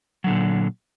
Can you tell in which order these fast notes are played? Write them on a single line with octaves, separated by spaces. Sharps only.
F#3 D3 A#2